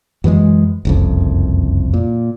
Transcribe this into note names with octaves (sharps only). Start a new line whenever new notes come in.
F#2 E3 F3 G#3
F#1 C2 F2
A#2